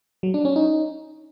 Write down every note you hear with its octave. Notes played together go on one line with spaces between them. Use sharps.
F#3
D4
C#4
D#4